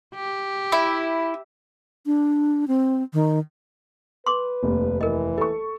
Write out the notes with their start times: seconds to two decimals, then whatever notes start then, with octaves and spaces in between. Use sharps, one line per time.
0.15 G4
0.72 E4
2.06 D4
2.68 C4
3.13 D#3
4.26 B4 C6 D6
4.63 F1 D#2
5.01 E3 A#4 D#5
5.38 A4 C#6